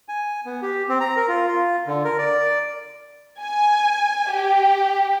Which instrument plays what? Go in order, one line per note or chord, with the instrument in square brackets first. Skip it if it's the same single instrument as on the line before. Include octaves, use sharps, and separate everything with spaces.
[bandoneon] G#5
B3
G4
C4
A#5
A#4
F4
F4
D3
A#4
D5
[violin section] G#5
G4